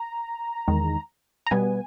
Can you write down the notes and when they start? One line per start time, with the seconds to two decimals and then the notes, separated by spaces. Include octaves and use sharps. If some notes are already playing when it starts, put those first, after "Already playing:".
Already playing: A#5
0.68 E2 D#3 G#3
1.47 A#5
1.51 B2 G3 B3 G#5